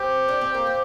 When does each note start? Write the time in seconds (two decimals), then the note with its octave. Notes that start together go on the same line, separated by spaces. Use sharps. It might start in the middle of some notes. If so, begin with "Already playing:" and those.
Already playing: C4 G4
0.28 D4
0.41 C4
0.54 A#3
0.67 C4